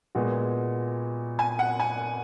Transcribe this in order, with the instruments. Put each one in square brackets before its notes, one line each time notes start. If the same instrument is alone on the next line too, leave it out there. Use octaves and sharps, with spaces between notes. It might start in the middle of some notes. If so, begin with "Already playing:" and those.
[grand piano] A#2 G#3 B3 F#4
[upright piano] G#5
F#5
G#5